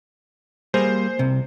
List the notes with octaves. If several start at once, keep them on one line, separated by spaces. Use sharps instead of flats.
G3 A#3 G#4 C5
C2 C3